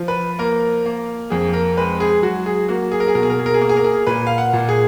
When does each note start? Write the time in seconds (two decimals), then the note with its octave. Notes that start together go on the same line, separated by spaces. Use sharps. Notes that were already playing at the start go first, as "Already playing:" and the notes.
Already playing: F3
0.08 B4
0.39 A#3 A#4
0.86 A#3
1.30 F2 G#4
1.53 A#4
1.77 G#3 B4
2.00 G#4
2.22 F#3 F#4
2.46 G#4
2.68 A#3 F#4
2.91 G#4
3.00 A#4
3.08 G#4
3.15 B2 A#4
3.23 G#4
3.30 A#4
3.39 G#4
3.46 A#4
3.54 G#4
3.61 A#3 A#4
3.69 G#4
3.77 A#4
3.84 G#4
4.07 A#2 B4
4.27 F5
4.38 F#5
4.53 A#2
4.69 G#4